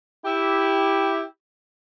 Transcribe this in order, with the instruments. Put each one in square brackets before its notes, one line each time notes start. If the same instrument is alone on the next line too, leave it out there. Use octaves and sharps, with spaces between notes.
[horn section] E4 G4